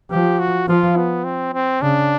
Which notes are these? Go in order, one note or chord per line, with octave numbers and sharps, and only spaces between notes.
F3 G4
F#4
F3 F4
B3
C4
C4
C#3 D4